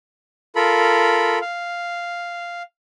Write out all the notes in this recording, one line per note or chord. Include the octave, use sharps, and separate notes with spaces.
F4 A4 A#4 B5
F5